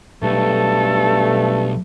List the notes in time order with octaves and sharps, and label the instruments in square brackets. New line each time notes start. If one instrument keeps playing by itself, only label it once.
[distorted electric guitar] B1 [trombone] G2 [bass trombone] A3 [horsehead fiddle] A4